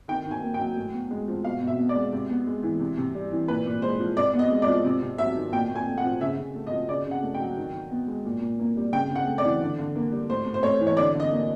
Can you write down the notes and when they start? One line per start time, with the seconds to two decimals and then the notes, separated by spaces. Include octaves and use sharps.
0.08 D#3 G5
0.26 D#3
0.31 G#5
0.42 A#3
0.54 G5
0.59 F#3
0.77 A2
0.93 B3
1.11 G#3
1.28 F3
1.44 B2 F5
1.61 B2
1.67 E5
1.79 B3
1.89 D5
1.96 G#3
2.13 C3
2.30 B3
2.47 G#3
2.63 E3
2.80 C3
2.97 C3
3.15 G3
3.32 E3
3.48 A#2 B4
3.66 A#2
3.82 G#3 C5
4.00 F3
4.17 C3 D5
4.34 B3
4.39 D#5
4.50 G#3
4.62 D5
4.67 F3
4.85 C3
5.02 C3
5.18 F#3 E5
5.36 D#3
5.52 A#2 G5
5.70 A#2
5.75 G#5
5.87 A3
5.98 F#5
6.04 F3
6.21 C#3 E5
6.38 C#3
6.55 A3
6.67 D#5
6.72 F3
6.88 C#3 D5
7.06 C#3
7.11 F#5
7.23 A3
7.34 G5
7.40 F#3
7.57 D#3
7.73 D#3
7.91 B3
8.08 G#3
8.25 A#2
8.41 A#2
8.59 A#3
8.77 G3
8.93 C#3 G5
9.10 C#3
9.16 F#5
9.27 A3
9.38 D5
9.44 E3
9.61 D3
9.79 D3
9.95 A#3
10.12 G3
10.29 A2 C5
10.46 A2
10.54 C5
10.63 A3 C#5
10.80 E3
10.87 C#5
10.97 D3 D5
11.14 D3
11.20 D#5
11.32 A#3